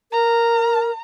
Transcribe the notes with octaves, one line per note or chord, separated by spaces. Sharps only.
A#4 A#5